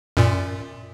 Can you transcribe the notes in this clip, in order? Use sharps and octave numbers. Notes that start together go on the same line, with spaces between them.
F#2 A#2